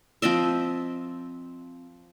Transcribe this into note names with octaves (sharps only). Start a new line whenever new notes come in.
F3 C4 D#5 E5